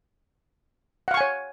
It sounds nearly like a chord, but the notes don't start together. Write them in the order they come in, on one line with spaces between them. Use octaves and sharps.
F#5 F5 C#6 G#5 C#5